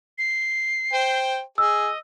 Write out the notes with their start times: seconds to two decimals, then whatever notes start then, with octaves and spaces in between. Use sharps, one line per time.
0.18 C7
0.93 C5 G5
1.58 G#4 D#5 E6